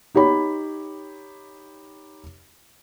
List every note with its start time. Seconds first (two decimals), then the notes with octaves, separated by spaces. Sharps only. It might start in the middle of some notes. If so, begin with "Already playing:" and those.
0.15 D#4 G4 C#5 B5